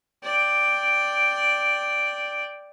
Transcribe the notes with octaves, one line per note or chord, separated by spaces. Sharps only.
D5 G5